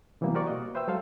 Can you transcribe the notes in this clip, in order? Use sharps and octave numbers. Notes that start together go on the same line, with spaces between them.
C3 E3 F#3 G3 A#3 B3
F#4 G4 A#4 C5 D5 C#6
B2 A#3 F#4 D#5
B4 C5 E5 G5 E6
F#3 G#3 A4 C5 F5